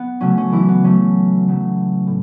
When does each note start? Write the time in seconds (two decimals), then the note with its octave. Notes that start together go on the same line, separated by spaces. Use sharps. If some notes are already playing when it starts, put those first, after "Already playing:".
Already playing: B3
0.21 C#3 F#3 A3 C#4
0.37 C#4
0.52 E3 E4
0.68 B3
0.84 C#3 F#3 A3 C#4
1.48 C#3 F#3 A3
2.07 A2